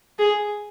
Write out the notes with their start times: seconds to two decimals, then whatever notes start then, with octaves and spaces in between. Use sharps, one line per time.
0.19 G#4